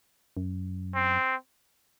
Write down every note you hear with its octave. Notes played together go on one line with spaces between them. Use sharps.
F#2
C4